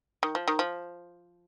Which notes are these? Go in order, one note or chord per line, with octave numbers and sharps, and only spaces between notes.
D#3
F3
D#3
F3